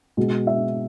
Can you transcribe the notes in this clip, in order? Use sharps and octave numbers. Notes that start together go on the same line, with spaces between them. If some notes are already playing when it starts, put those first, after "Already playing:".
B2 G#3
E5